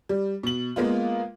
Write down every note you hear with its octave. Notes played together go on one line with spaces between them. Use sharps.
G3
B2 F#7
G#3 A#3 B3 F4